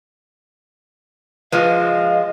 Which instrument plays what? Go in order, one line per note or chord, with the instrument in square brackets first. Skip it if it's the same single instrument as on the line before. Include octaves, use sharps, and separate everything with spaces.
[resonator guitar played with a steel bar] F3 G#3 [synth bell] F4 B4 [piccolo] D#5 [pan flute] F5